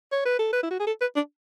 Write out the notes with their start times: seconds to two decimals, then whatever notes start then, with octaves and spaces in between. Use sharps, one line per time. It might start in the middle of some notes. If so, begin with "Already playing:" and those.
0.12 C#5
0.25 B4
0.39 A4
0.53 B4
0.63 E4
0.71 F#4
0.80 G#4
0.87 A4
1.01 B4
1.16 D4